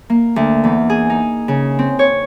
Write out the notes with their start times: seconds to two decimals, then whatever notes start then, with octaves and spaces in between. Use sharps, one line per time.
0.10 A#3
0.36 D2
0.64 E2
0.90 G#4
1.10 D#4
1.48 C#3
1.79 C4
1.99 C#5